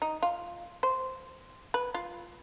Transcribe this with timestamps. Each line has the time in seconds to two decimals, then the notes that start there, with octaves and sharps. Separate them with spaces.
0.02 D#4
0.23 F4
0.83 C5
1.74 B4
1.94 F4